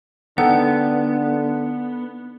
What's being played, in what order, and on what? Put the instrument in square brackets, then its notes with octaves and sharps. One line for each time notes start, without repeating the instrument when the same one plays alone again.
[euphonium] D3 [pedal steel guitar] B3 [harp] D#4 A4 G5 [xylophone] F#5